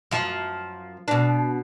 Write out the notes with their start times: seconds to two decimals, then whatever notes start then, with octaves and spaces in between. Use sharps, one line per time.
0.11 F#2 F3
1.08 B2 D4